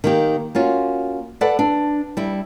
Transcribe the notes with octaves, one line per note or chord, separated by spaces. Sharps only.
D#3 A#3 G4
A#3 C#4 F4 F#4
A4 B4 D5 F#5
D4
G3 E4